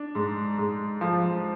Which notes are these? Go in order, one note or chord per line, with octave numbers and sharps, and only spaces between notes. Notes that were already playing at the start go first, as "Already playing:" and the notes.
Already playing: D4
G#2
G#2
F3